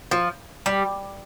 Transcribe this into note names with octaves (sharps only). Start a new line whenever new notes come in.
F3
G3